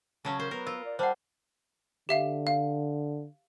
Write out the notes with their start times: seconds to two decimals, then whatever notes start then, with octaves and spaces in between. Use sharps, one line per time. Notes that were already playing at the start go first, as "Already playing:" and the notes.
0.25 C#3 F#3 C#4 A5
0.40 A#4 C5
0.51 B3 A#4
0.67 F4 A#4
0.85 D5
0.99 G3 C5 F#5 A5
2.09 D3 G4 E5 F5
2.47 F5